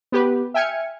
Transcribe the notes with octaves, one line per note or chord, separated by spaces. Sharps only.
B3 G4 B4
E5 G5 G#5 F6 G#6 C#7